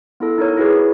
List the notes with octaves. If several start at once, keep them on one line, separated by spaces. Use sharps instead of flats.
B3 E4 A4
D#4 E4 A#4 C#5
E4 F#4 G#4 B4 C#5